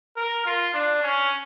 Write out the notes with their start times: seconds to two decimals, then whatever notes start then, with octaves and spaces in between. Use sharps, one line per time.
0.17 A#4
0.46 F4
0.74 D4
1.03 C#4